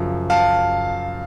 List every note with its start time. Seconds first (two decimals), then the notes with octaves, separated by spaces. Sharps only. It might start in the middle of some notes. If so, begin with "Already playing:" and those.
Already playing: F#2 C#3 F3
0.30 F5 A5